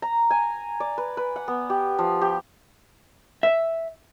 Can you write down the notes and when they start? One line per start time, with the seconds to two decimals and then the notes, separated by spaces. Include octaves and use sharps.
0.02 A#5
0.31 G#5
0.80 D5
0.98 B4
1.17 B4
1.36 F#5
1.48 B3
1.70 G4
1.99 F3
2.21 G4
3.43 E5